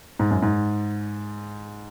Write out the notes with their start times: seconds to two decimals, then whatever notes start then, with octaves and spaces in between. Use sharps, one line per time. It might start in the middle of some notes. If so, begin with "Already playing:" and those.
0.19 G#2
0.31 F#2
0.42 G#2